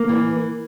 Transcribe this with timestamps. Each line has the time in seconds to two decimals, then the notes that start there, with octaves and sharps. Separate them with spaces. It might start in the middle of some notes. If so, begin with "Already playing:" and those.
Already playing: A#3
0.09 E3